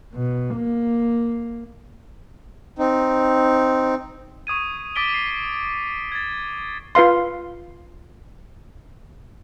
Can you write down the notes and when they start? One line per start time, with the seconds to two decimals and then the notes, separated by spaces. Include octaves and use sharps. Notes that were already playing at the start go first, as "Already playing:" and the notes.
0.14 B2
0.55 A#3
2.79 C4 D#4
4.47 C#6 D#6 G#6 D#7
4.95 D6 D#6 A6 B6 D7 G7
5.14 C7
6.12 G#6 A6
6.95 F4 B4 F5 C6